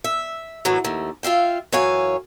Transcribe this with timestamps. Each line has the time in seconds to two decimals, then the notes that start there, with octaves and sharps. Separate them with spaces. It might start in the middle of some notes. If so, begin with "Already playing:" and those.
0.04 E5
0.65 F#2 A2 E3 F#3
0.84 D#2 A3
1.23 F4 E5 F5 G5
1.72 F#2 E3 C#5 F5 G#5